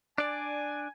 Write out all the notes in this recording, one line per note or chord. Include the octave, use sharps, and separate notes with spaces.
D4 D5 G#5